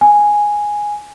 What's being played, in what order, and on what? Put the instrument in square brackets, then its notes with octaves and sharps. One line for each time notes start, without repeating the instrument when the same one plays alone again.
[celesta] G#5